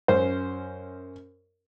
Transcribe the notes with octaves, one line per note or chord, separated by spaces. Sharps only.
F#2 C#4 C5